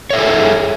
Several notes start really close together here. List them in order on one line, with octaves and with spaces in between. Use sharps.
C#5 E5 A4 G#4